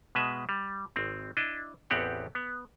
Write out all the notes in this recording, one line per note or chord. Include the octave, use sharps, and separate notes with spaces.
B2 G#3 B4 E5
G3
G#1 C4
D4 E4 D#5
A1 E2 B3 C4 G4 F#5
B3